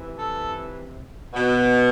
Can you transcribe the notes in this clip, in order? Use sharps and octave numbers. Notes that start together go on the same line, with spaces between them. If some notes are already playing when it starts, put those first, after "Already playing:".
Already playing: C3 E3
A4
B2